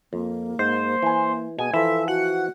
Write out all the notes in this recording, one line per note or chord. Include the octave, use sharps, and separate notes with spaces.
F2 A#3
G#2 C5
E3 G#5
B2 B3 G#4 G#5
E3 F3 A4 E5
F#4 F#5